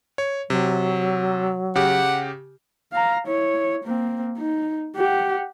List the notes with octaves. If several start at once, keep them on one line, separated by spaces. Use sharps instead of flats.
C#5
C3 F#3
C#3 G4 F#5
F5 A#5
E4 C#5
A#3 C4
D#4
G4 F#5